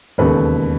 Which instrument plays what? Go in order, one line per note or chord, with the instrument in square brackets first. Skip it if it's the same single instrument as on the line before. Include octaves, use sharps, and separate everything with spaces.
[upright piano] E1 D#2 C#3 A4 B4